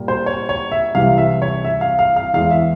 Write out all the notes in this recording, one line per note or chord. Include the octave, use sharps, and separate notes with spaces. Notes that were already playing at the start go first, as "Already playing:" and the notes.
Already playing: A#2 G3 A#3
C5
C#5
C#5
E5
C2 C3 E3 F5
E5
C#5
E5
F5
F5
F5
E2 E3 G#3 F5
E5